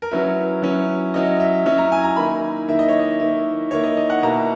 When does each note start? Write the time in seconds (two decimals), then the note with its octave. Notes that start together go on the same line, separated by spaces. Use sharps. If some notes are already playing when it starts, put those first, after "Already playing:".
0.02 A#4
0.11 F#3 C#4 E4 B4
0.62 F#3 C#4 E4
1.14 F#3 C#4 E4 D#5
1.40 E5
1.66 F#3 C#4 E4
1.78 A#5
1.92 G#5
2.04 A#5
2.16 D#3 A#3 E4 B5
2.68 D#3 A#3 E4 E5
2.79 D#5
2.89 C#5
2.99 D#5
3.20 D#3 A#3 E4
3.71 D#3 A#3 E4 C#5
3.84 D#5
3.97 D#5
4.10 F#5
4.22 B2 A#3 E4 A#5